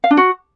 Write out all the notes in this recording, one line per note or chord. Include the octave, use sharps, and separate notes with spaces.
F5
D4
F#4